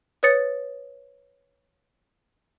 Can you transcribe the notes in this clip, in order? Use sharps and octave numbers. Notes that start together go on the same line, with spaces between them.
B4 C#5 D#6 A6 C#7